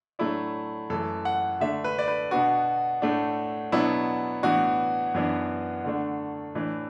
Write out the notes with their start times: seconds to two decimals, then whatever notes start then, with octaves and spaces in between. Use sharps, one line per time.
0.19 A2 F#3 A3 D4 E4
0.90 F#2 E3 A3 A4
1.25 F#5
1.60 D3 A3 D4 E5
1.84 B4
1.99 D5
2.08 B4
2.31 B2 B3 D4 F#4
3.02 A2 A3 D4
3.72 B2 F#3 B3 D4 E4
4.43 A2 E3 B3 D4 F#4
5.14 F#2 E3 B3 D4
5.84 D3 A3 D4
6.55 A2 E3 D4